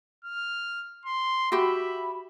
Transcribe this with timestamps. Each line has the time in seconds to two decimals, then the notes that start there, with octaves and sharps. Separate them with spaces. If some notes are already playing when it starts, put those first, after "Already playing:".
0.24 F6
1.06 C6
1.52 F#4 G4 E5 B5